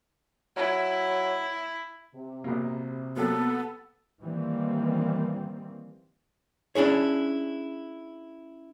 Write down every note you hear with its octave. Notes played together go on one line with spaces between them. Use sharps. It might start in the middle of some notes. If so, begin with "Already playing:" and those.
F#3 E4
C3
A#1 B2 A#3
F#3 A#3 B3 G4 A4
D#3 E3 G3 A#3 C4
C#4 D4 E4 G#4 C#5